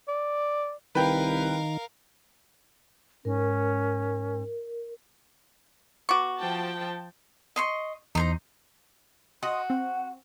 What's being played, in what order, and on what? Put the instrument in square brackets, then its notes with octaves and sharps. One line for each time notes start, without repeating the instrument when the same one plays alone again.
[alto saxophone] D5
[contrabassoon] C2 [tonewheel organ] D#3 [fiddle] A#4 F5 [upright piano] B4 G5
[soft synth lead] G#2 [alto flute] C#4 [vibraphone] A#4
[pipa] B3 F#4 [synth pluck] C#6 D6
[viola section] F3 G5 A5
[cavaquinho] D#5 C6 C#6
[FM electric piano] E2 [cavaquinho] D#4 C5 A#5
[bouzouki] F#4 [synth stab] D#5 D#6 [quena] C6
[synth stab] C4 [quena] F#5